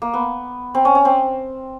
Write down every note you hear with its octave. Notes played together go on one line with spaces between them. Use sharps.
A#3
B3
C4
C#4
C#4
C4